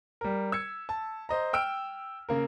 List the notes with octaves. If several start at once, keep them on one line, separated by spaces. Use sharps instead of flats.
G3 A#4
E6 G#6 C#7
A5
C5 D#5 A#5
G5 E6 F6 D7
C#3 A#3 A#4